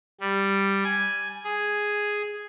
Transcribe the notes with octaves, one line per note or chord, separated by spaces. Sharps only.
G3
G#5
G#4